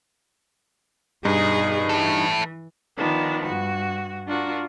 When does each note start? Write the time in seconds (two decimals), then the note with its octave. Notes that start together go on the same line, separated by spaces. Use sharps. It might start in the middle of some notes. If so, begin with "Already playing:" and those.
1.25 G2 B2 D#4 G#4
1.89 E3 E4 A4
2.96 D#3 F3 B3 D4
3.44 G2 F#4
4.26 D4 F4 F#4 A#4